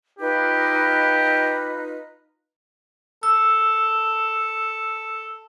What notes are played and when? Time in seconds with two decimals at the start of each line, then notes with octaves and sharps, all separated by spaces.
0.19 D#4 F4 G4 B4
3.23 A4 E6